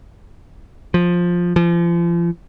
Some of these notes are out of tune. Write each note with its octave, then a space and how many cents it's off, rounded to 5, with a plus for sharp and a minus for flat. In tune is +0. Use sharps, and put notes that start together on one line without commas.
F3 +10
F3 -35